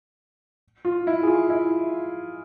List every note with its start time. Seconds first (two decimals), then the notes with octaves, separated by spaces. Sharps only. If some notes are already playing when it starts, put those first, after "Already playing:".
0.85 F4
1.07 E4
1.23 G#4
1.27 F4
1.50 E4